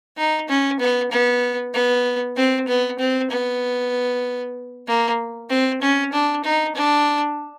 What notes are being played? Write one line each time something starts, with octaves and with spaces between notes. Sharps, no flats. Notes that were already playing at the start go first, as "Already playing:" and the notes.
D#4
C#4
B3
B3
B3
C4
B3
C4
B3
A#3
C4
C#4
D4
D#4
D4